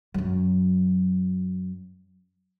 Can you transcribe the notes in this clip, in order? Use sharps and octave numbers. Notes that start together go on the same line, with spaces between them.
F#2 F#3